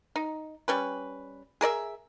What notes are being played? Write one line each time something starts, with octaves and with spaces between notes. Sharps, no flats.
D#4
G3 C#4 B4
G#4 A#4 D5 E5